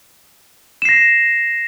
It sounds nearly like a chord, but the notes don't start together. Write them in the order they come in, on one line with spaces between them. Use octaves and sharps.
E7 C7 A#6